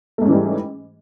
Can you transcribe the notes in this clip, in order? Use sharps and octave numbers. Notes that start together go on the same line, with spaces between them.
G#2 E3 G3 A3 C#4